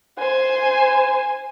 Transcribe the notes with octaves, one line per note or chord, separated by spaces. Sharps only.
C5 G#5